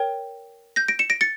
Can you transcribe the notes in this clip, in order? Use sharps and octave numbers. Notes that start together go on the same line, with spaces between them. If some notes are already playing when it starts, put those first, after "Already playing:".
Already playing: A#4 C#5 G5
G6 A#6
A#6 D7
C#7 E7
A#6 D7
A6 C#7